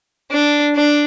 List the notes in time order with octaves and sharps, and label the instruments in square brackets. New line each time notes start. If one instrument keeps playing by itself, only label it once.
[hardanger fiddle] D4
D4